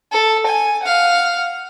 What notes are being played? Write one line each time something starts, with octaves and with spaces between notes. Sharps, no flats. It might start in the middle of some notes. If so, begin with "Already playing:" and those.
A4
G#5
F5 F#5